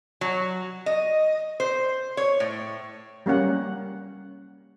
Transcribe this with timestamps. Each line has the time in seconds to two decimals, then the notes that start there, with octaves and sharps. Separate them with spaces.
0.21 F#3
0.86 D#5
1.60 C5
2.17 C#5
2.40 A2
3.26 G3 A#3 C#4 F#5